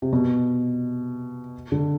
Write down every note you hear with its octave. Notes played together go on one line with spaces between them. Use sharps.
C3
B2
D3